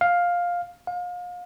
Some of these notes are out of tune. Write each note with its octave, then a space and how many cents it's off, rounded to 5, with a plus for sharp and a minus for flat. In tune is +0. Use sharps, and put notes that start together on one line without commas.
F5 +10
F5 +35